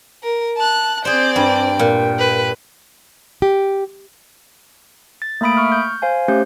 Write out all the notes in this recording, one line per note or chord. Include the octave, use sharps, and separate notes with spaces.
A#4
A5 F#6
C4 G#4 C5 D5 G6
G2 G5
A#2
B4
G4
A6
A3 A#3 E5 B5 D#6 D7
C#6 F6
G6
C5 F5 G#5
A3 C#4 G4 C5 G6